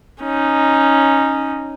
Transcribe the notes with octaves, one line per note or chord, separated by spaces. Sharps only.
C#4 D#4